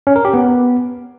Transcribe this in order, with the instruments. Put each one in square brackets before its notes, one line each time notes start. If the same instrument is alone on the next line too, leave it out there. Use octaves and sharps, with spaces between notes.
[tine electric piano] C#4
A#4
G4
B3